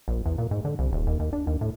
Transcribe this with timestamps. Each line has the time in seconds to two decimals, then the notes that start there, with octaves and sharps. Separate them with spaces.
0.08 A#1
0.26 E2
0.38 A#2
0.51 G#2
0.65 D3
0.79 C2
0.92 D#1
1.07 D#2
1.20 D#2
1.33 D4
1.47 D#2
1.61 A2